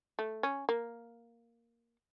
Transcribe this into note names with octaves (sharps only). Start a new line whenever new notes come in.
A3
C#4
A#3